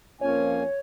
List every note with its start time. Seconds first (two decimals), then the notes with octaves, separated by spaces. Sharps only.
0.21 F2 F3 A#3 C#4 C#5 G#5